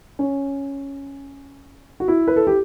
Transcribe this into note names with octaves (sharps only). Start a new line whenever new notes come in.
C#4
F#4
E4
B4
A4
G4